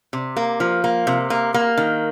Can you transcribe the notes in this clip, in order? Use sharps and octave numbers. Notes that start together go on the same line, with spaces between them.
C3
A#3
F3
A#3
C3
A#3
A#3
D#3